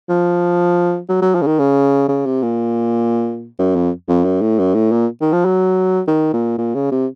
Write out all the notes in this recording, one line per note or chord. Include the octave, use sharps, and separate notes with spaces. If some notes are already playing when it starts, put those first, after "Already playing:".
F3
F#3
F#3
F3
C#3
D#3
C#3
C#3
C3
A#2
F#2
F2
F2
F#2
A2
F#2
A2
A#2
D#3
F3
F#3
D#3
A#2
A#2
C#3
C3